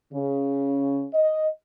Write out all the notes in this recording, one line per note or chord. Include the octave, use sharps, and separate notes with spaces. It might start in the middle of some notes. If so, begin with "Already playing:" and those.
C#3
D#5